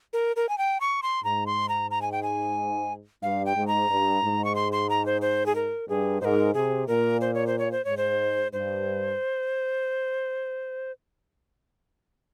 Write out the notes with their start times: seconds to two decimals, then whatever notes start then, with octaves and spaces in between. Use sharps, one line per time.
0.13 A#4
0.36 A#4
0.49 G#5
0.58 G5
0.81 C#6
1.03 C6
1.24 G#2 A#5
1.46 C6
1.69 A#5
1.91 A#5
2.02 G#5
2.12 G5
2.23 G#5
3.23 G2 F5
3.46 G5
3.56 G#2
3.67 A#5
3.90 G2
4.23 G#2
4.45 C#6
4.55 C6
4.72 C6
4.90 A#5
5.06 C5
5.22 C5
5.46 G#4
5.55 A#4
5.88 G2 G#4
6.21 G#2 A#4 C5
6.54 C3 G#4
6.87 A#2 A#4
7.21 C5
7.34 C#5
7.47 C5
7.59 C#5
7.72 C5
7.85 G#2 C#5
7.97 C5
8.53 G2 C5